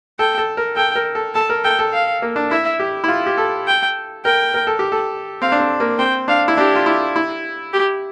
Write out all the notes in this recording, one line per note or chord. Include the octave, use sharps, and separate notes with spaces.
A4 G5
A4
A#4
A4 G5
A#4
A4
A4 A5
A#4
A4 G5
A4
F5
A#3
D4
E4 E5
G4
E4
F4
G4
A4
G5
A#4 G5
A#4
A4
G4
A4
C4 F5
D4
C4
A#3
C4 G5
D4 F5
E4
D4 G4
F4
E4
E4
G4